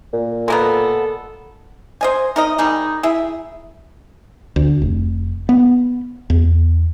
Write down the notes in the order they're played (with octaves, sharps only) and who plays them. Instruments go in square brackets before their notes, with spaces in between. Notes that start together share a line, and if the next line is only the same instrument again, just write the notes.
[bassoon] A#2
[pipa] G#3 A#3 B3 [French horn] A4
[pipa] C5 D#5 G#5
D#4 A#4 D#5
D#3 G3 D#4 G#4
E4 G#4 E5
[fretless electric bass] D2
F1
B3
E2